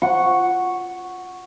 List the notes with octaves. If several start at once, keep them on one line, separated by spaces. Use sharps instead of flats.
F#5 C#6